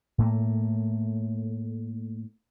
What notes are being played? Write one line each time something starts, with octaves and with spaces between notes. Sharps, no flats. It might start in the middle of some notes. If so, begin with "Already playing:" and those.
A2 A3 A#3